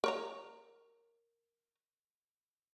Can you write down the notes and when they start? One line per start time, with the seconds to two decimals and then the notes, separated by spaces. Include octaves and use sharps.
0.04 A#4 C#5 A#5